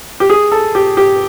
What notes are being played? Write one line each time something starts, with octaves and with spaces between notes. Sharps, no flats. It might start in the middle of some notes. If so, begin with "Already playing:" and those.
G4
G#4
A4
G4
G4